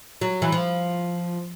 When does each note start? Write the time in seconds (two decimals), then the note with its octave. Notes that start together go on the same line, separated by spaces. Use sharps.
0.21 F#3
0.42 E3
0.52 F3